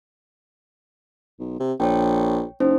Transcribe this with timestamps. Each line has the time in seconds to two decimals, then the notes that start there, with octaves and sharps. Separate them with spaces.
1.39 B1
1.60 C3
1.80 A#1 C#5 G5
2.60 F#1 C#4 D#4 C5